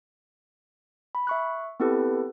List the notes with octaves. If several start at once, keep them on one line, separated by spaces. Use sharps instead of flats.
B5
E5 C#6 F#6
B3 C4 E4 G4 A4 B4